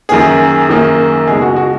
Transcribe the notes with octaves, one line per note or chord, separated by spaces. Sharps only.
F#2 D#3 A#3 G#4
F#2 D#3 A#3
C#2 B2 G#3 G#4
F#4
F#4